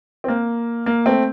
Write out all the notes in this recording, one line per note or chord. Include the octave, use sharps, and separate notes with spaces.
C4
A#3
A#3
A3 C4